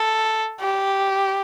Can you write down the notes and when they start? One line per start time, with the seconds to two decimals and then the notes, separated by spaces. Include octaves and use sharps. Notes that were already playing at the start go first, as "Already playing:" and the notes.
Already playing: A4
0.61 G4